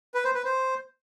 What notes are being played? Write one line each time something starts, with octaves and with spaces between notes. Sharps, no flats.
B4
C5
B4
C5